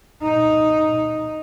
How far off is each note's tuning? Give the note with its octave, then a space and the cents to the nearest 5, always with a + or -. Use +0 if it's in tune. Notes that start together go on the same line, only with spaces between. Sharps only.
D#4 +0